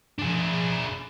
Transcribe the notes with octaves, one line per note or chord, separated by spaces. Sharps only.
D4 G#4